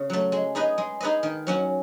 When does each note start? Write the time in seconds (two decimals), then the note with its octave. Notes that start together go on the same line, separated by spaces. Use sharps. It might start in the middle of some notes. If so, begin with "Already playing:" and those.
Already playing: C#3
0.10 F#3 A3
0.32 G#3
0.55 D#4 G#4 B4 D#5
0.78 G#3
1.00 D#4 G#4 B4 D#5
1.23 D#3
1.47 F#3 C#4 F#4